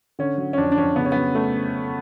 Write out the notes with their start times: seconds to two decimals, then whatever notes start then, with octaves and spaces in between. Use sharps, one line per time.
0.19 D3 C#4
0.38 F#3
0.53 C#4
0.58 F2 D4
0.72 D4
0.78 F2 C#4
0.96 C#3 B3
1.05 C#4
1.12 F#3 B3
1.35 A3